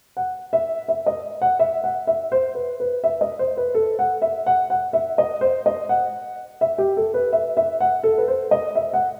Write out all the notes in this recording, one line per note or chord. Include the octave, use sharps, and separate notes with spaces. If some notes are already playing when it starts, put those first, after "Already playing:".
F#5
E5
E5
D#5
F#5
E5
F#5
E5
C5
B4
B4
E5
D#5
C5
B4
A4
F#5
E5
F#5
F#5
E5
D#5
C5
D#5
F#5
E5
G4
A4
B4
E5
E5
F#5
A4
B4
C5
D#5
E5
F#5